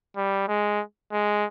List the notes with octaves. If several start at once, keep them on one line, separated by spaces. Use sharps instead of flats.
G3
G#3
G#3